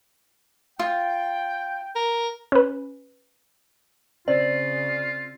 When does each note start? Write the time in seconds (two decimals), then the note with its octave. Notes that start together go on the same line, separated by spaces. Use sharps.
0.79 F4 G5
1.96 A#4
2.52 C#4 B4
4.28 C#3 C4 F4 D5